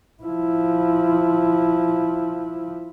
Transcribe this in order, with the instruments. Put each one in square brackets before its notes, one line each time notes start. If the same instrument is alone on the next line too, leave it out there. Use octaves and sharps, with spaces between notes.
[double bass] F3 E4